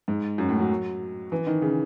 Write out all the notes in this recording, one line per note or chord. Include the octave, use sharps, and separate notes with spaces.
G#2
F#2
A2
F#3
E3
D#3
C#3